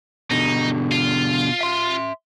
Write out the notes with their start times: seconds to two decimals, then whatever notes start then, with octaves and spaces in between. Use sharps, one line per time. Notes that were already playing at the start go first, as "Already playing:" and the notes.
0.31 B2 D3 D#4
0.92 F4
1.61 E5 C6